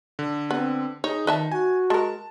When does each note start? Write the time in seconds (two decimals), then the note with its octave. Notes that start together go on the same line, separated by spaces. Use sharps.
0.19 D3
0.51 B3 C4
1.04 D#4 G#4 C#5
1.27 D#3 B4 E5 A5
1.52 F#4 G#5
1.90 G#3 A#4 A5